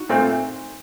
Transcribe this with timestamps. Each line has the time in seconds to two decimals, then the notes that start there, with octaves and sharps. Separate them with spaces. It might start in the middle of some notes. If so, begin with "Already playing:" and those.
Already playing: D#4 F#4
0.09 A#2 A3 C4